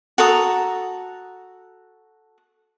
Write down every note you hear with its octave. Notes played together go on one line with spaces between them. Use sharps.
F#4 A4 A#5 D#6